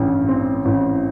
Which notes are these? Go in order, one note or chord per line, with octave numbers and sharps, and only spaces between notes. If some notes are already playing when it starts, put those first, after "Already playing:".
Already playing: A1 G2
C4
A1